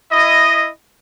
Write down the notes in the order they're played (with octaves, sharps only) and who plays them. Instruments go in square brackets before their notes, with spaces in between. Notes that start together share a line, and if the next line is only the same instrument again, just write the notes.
[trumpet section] E4 D#5